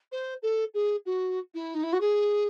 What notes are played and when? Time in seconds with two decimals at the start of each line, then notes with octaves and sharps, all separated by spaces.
0.12 C5
0.42 A4
0.74 G#4
1.06 F#4
1.54 E4
1.74 D#4
1.83 E4
1.93 F#4
2.01 G#4